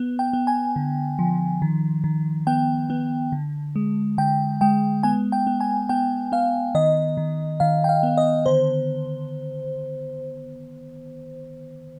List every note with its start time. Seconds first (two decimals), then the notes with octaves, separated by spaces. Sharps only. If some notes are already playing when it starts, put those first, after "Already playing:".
Already playing: B3
0.19 G5
0.33 B3
0.47 G#5
0.76 D3
1.19 F3
1.62 D#3
2.04 D#3
2.47 B3 G5
2.90 B3
3.32 D3
3.76 G#3
4.18 D3 G5
4.61 G#3 G5
5.03 B3 G#5
5.32 G5
5.47 B3
5.60 G#5
5.89 B3 G5
6.32 B3 F5
6.75 D#3 D#5
7.17 D#3
7.60 D#3 F5
7.84 G5
7.89 F5
8.03 B3
8.17 D#5
8.46 D3 C5